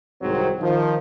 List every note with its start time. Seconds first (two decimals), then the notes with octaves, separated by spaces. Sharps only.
0.22 C2 G#2 D#3 F#3 C4
0.60 D#3 F3